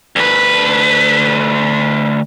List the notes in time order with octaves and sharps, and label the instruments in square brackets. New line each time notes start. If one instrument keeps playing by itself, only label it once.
[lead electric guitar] D2 B4